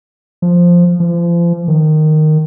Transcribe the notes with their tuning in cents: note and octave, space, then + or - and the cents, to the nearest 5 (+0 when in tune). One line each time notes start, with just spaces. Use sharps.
F3 +0
F3 -35
D#3 -10